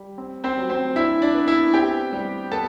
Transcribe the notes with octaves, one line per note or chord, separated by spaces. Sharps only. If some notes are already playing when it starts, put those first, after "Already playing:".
Already playing: G3
C4
C4 C5
F#3
C4 C5
D4 E4 E5
D4 D5
B3
E4 E5
C4 G4 G5
G3
B3 A4 A5